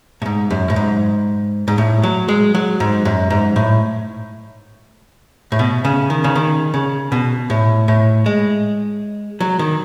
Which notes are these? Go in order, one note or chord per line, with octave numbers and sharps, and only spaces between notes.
A2
G#2
F#2
A2
G#2
G#2
A2
F#3
G#3
F#3
G#2
F#2
G#2
A2
A2
B2
C#3
D#3
C#3
D#3
C#3
B2
A2
A2
G#3
F#3
D#3